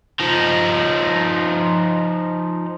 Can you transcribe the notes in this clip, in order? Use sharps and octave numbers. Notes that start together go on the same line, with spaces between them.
F3 D#4